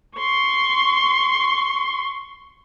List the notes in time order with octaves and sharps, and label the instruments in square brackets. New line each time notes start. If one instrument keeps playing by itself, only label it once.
[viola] C6 C#6